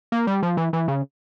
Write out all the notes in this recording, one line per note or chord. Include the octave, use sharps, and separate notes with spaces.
A#3
G3
F3
E3
E3
C#3